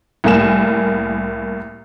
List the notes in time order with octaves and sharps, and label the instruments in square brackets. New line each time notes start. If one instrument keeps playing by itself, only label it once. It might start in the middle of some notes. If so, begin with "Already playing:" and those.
[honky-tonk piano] C2 A2 A#3 G#5 E7